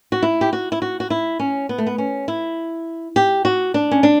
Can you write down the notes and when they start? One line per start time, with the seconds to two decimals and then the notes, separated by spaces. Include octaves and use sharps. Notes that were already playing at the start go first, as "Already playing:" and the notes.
0.12 F#4
0.23 E4
0.41 G4
0.53 F#4
0.72 E4
0.82 F#4
1.00 F#4
1.10 E4
1.39 C#4
1.69 B3
1.78 A3
1.86 B3
1.98 C#4
2.28 E4
3.16 G4
3.45 F#4
3.74 D4
3.91 C#4
4.03 D4